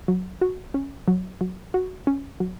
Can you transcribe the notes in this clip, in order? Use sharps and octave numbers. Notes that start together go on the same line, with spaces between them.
F#3
F#4
C#4
F#3
F#3
F#4
C#4
F#3